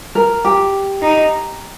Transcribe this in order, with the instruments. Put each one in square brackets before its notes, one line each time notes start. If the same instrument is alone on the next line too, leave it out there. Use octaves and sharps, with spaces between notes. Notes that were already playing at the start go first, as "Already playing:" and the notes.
[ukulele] A#4
G4
[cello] D#4